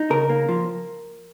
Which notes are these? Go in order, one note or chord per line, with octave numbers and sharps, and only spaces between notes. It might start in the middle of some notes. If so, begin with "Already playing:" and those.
Already playing: D#4
C#3 A#4
A#3
F3